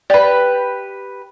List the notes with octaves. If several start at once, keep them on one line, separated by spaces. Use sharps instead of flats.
G4 B4 D5